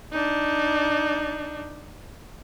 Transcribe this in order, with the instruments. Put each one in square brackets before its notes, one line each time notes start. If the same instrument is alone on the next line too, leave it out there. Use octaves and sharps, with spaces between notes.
[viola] D4 D#4